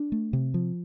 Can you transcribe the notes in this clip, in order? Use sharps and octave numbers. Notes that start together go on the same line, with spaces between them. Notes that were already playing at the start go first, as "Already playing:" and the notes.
Already playing: D4
A3
C3
F3